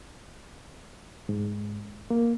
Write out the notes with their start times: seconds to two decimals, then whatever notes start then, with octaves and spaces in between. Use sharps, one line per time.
1.29 G#2
2.10 A#3